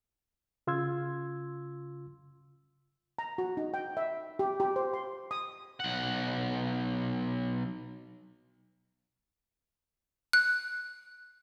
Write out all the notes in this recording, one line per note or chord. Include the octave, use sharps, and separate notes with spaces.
C#3 F4 C6 E6 G#6
A#5
F#4
D#4
G5
E5
G4
G4
C5
C6
D#6
B1 F#5
F#6